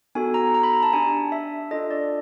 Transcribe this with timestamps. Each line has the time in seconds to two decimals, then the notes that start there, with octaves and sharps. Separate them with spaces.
0.15 B3 D#4 F#4 A4 G#5
0.34 A#5
0.54 A#5
0.63 B5
0.73 A#5
0.83 A5
0.93 D4 G4 G#5
1.32 E5
1.71 D4 F4 A4 D#5
1.91 D5